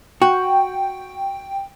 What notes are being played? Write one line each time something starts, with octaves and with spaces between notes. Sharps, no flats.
F#4 G5